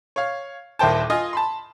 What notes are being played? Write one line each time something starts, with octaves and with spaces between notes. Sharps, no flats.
C#5 F5
D#1 D#2 E4 C5 G5 A5
F4 D#5 G#5
A5 B5 C6